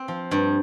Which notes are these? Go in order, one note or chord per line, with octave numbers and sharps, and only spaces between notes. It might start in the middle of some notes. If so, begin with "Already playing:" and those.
Already playing: C4
F3
G2